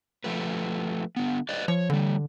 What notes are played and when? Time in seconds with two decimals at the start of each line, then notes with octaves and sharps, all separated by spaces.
0.24 F3 A3 B4
1.16 D3 B3
1.49 B4 D5 D#5
1.68 F3 C#5
1.90 D3 E3 G3